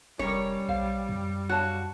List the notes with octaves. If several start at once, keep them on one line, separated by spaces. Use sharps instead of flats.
F1 G3 C#4 A#4 C#5
B1 C5 F5
F#2
F#4 C#5 F5 A5